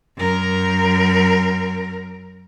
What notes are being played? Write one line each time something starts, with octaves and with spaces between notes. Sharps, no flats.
F#2 A#4